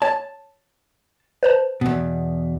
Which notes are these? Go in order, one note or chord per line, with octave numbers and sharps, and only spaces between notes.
C#5 A5
B4 C5 A5
E2 B2